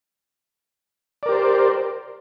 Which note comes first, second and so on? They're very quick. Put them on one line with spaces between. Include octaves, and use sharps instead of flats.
D5 A#4 G4 C5